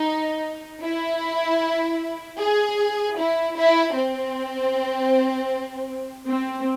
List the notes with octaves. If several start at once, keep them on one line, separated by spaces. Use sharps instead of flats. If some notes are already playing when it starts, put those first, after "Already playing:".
Already playing: D#4
E4
G#4
E4
E4
C4
C4